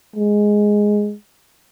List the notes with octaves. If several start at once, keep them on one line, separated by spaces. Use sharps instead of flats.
G#3